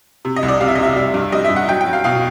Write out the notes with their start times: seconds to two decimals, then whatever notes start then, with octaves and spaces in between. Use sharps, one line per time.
0.25 C3
0.36 D#5
0.43 C2
0.48 D5
0.60 C3 F5
0.68 E5
0.75 D#5
0.79 C3 E5
0.96 G3
1.14 G2
1.32 G3 D#5
1.44 E5
1.50 G2
1.56 F#5
1.68 F#3 G5
1.81 G5
1.86 F#3
1.93 F5
2.04 B2 F5